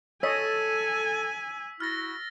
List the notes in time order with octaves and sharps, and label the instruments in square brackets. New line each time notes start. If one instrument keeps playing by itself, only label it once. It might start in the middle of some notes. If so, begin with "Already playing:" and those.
[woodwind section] A4 [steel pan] C#5 D#5 [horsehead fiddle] G#5 [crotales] E6 B6
[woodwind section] E4 F#4 [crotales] F6 A6 A#6